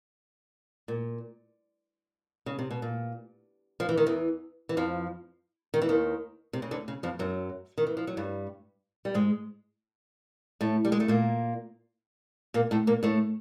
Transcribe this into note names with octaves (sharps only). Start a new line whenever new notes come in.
A#2
C#3
C3
B2
A#2
F3
E3
D#3
E2 E3
E3
F2 F3
D#3
E3
D#2 D#3
C3
C#3
D2 D3
C#3
F2 F3
F#2 F#3
D#3
E3
F3
F#3
G2 G3
G3
G#2 G#3
A2 A3
G3
G#3
A3
A#2 A#3
A#2 A#3
A2 A3
A#2 A#3
A2 A3